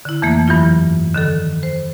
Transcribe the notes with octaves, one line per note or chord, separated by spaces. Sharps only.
D3 E4
F2 E3 A3 A#3
G2 E3 F#3 E4 F4 F6
D3 D#3 A4
C5